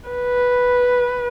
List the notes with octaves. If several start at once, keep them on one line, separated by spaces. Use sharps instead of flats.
B4